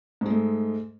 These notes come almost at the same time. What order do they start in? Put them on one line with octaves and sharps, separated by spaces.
G#2 G#3 A3